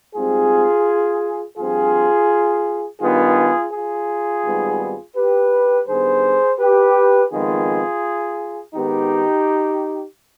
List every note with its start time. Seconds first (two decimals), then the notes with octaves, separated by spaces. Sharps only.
0.14 G#2 G3 C4 F4 G#4
1.58 G2 F3 C4 F4 G#4
3.02 G2 D#3 B3 F4 G#4
3.73 F4 G#4
4.44 G#1 G#2 G3 B3
5.17 G4 B4
5.88 G2 D#3 B3 G#4 C5
6.60 G4 B4
7.32 F2 D#3 G#3 B3 F4 G#4
8.75 G#2 D#3 B3 D#4 G4